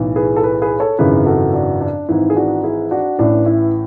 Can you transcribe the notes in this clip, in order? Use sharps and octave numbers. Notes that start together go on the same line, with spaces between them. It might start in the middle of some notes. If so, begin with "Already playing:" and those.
Already playing: B1 A2 E3
G#4 B4
A4
G#4 B4
G#4 B4
A4 C#5
G#1 F#2 C#3 E3 G#4 B4
F#4 A4
D4 F#4
D4
G#1 G#2 E3 E4
G#4
D4 F#4
E4 G#4
D4 F#4
A1 A2 E3 D4
E4